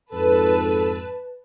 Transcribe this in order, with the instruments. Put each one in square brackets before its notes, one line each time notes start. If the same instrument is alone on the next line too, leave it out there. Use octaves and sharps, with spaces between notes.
[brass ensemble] F2 G#2 A4 [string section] B4 A5